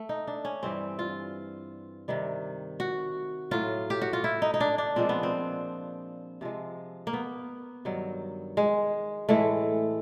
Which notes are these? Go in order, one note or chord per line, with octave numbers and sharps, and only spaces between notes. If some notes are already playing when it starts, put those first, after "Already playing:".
Already playing: A3
D#4
D4
C#4
G2 E3 G3 C4
F4
C3 D#3 G3
F#4
A2 F#3 F4
G4
F#4
F4
E4
D#4
D#4
D4
D4
A#2 F3 G#3 C4
B3
C4
C3 F3 G#3
A#3
B3
G2 D#3 F#3
G#3
A2 E3 G#3 A3